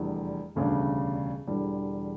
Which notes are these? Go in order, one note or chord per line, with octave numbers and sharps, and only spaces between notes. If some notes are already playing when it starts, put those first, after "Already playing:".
Already playing: F1 E2 D3 G3
E1 D2 C#3 G3 D4
E1 E2 D3 G3